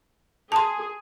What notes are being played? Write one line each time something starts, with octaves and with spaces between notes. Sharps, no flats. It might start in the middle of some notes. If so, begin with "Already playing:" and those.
G#4 A5 C6